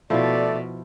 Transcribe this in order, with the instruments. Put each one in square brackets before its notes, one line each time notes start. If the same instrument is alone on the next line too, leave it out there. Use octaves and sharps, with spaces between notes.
[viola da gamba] B2 [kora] F3 E4 [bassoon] A3 [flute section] D5